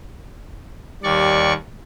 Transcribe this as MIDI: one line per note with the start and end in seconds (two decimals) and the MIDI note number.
1.04 1.53 39
1.04 1.56 55
1.04 1.53 74
1.04 1.53 85